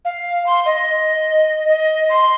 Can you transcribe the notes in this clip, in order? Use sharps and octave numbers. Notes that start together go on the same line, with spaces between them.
F5
C6
D#5
D#5
C6